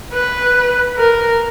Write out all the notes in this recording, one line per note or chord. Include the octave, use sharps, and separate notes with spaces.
B4
A#4